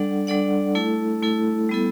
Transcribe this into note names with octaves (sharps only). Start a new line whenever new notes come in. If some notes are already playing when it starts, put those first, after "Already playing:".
Already playing: G3 D4 A4 D5 F#5
G3 D4 A4 D5 F#5
A3 E4 A4
A3 E4 A4
G3 B3 E4 A4